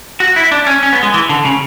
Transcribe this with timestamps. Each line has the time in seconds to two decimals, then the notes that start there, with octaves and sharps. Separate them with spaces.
0.20 F#4
0.36 E4
0.51 D4
0.67 C#4
0.83 C#4
0.93 B3
1.03 G#3
1.14 E3
1.29 D3
1.45 C#3